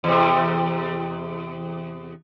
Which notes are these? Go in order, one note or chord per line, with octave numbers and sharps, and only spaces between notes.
E2 C3